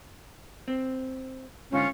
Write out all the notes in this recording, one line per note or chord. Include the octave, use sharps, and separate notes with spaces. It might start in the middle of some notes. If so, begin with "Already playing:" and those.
C4
G#2 D3 C#4 F4